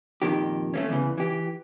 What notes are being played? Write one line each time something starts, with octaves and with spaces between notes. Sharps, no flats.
F2 A#2 D#3 G4
A3 A#3 C#4
E2 C#3 E3
E3 G4